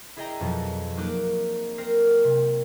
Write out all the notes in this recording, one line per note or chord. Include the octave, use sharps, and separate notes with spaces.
E4 G#4 D5 D#5 G5 A#5
F2 B2 F3 F#3
F#3 A#3 D#4 D6 F#6
C4 A#4 A#6 C7
C3